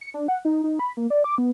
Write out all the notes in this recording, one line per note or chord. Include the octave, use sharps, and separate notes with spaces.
C#7
D4
F#5
D#4
D#4
B5
A#3
D5
D6
B3